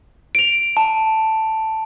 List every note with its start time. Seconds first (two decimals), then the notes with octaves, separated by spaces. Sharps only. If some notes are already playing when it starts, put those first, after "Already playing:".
0.35 D7 F7
0.77 A5